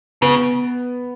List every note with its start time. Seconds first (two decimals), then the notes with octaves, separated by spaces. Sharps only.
0.22 C#3 B3